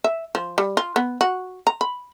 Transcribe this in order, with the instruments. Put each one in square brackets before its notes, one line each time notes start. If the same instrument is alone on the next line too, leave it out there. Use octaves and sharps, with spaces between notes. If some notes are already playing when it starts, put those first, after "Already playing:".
[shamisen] E5
F3
G3
F4
B3
F#4
A#5
B5